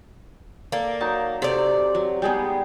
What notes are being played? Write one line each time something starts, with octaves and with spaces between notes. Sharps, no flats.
A#3 A4 D5
F#3 D#4 A5
C3 A4 D5
F#3
G3 G#3 B3 D#4 G#4 G5